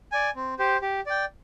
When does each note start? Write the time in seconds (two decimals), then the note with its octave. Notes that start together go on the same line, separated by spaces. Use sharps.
0.12 D5 G#5
0.35 C4
0.59 G4 C5
0.82 G4
1.06 D5 G5